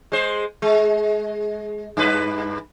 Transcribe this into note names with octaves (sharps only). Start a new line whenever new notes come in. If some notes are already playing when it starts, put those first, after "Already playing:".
G#3 C5
G#3
G2 B4